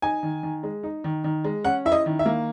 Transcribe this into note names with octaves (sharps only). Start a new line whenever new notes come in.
D#4 G#5
D#3
D#3
G#3
D#4
D#3
D#3
G#3
C#4 F#5
E4 E5
D#5
D#3
E5
A#3